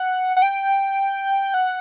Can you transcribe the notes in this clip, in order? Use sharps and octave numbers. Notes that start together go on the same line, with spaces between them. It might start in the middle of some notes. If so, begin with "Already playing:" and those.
Already playing: F#5
F#5
G5
F#5